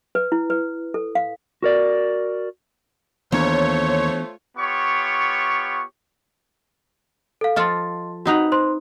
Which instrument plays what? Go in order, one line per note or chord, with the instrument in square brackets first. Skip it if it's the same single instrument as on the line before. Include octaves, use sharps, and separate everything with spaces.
[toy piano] B4
E4
B4
A4
F5
[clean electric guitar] F#4 A#4 D5
[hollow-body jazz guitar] D#2 [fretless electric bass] E3 B3 D4 [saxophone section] A3 F4 C5 [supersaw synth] C#5
[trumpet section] B3 F4 G4 C#5 C#6
[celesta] A4 F5
[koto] F3 F4 A4 [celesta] D#5 C6
[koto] C4 D#4 B4 [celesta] F#4 F#5 F7
[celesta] C5 C6